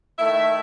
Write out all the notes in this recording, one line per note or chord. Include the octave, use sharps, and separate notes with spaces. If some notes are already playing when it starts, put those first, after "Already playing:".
D#3 A3 E4 E5